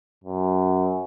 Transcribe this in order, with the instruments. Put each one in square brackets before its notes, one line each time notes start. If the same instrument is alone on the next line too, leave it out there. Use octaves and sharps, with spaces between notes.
[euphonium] F#2